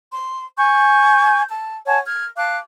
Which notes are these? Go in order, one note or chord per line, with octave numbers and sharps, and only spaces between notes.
C6
G#5 C#6 G6
A5
C#5 F#5 G#5 A5
F6 G#6
F5 A5 D6 F#6